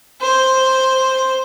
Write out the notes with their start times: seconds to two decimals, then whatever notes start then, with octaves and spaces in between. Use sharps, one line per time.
0.22 C5